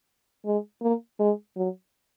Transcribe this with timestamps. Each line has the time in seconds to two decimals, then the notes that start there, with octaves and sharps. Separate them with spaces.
0.46 G#3
0.82 A#3
1.20 G#3
1.57 F#3